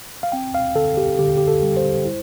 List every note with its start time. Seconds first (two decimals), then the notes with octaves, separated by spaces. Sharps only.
0.23 F5
0.32 C4 G5
0.55 F5
0.75 D3 A4
0.97 G4
1.19 D3 G4
1.37 G4
1.48 A4
1.62 G3
1.77 C5
2.05 E4